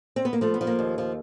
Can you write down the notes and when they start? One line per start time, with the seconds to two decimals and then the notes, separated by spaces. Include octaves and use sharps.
0.16 C4
0.25 B3
0.33 A#3
0.41 F3 A3
0.54 B3
0.61 F3
0.67 A#3
0.79 D#2
0.98 F3